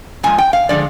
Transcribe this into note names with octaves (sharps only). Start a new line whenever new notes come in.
A#2 F3 G#3 G#5
G5
F5
D3 F3 G#3 D5